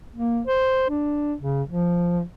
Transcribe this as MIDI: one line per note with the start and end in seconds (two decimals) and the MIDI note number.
0.16 0.41 58
0.47 0.86 72
0.90 1.34 62
1.40 1.62 49
1.70 2.22 53